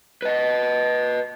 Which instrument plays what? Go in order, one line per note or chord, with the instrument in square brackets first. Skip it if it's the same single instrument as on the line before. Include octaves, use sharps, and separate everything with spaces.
[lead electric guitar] B4 D#5